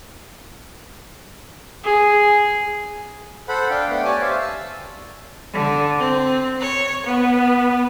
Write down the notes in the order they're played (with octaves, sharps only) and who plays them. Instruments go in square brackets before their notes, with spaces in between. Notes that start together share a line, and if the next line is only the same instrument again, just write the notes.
[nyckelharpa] G#4
[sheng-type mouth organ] A4 C5 F#5 B5
D4 F5 G5
A3 B3 D4 F#5 G5
G4 C#5 D5 G#5 A5
C5 E5 F5
A5 E6
[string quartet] D3
C4
C#5
B3